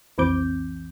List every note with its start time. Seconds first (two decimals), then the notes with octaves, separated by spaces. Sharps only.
0.18 B1 F2 E3 C4 D6 G6